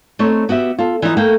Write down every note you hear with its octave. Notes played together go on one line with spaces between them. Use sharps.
A3 C4 D#4 C#5
B3 F#4 G4 E5
F4 A4
E3 F3 D#4
A3 A#3 A4 G5